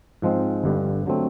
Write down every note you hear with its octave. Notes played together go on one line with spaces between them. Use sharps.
G#2 F3 G#3 C4
G1 G2 D3 G3
D3 F#3 A3 C4